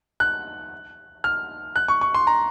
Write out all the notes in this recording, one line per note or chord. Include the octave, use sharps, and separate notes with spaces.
F#6
F6
F#6
C#6
C#6
C6
A#5